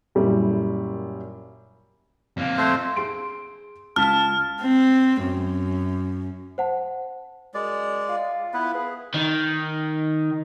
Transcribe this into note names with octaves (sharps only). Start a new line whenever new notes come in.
F#2 A#2 G3 E4
F2 A#3
A3 C4 C5
G#4 C6 D7
C#2 A5 F6 B6
C4
F#2
C5 F#5 A5
F#2 G#3 D5
F4
B3 E4 B4
G#4 B4
D#3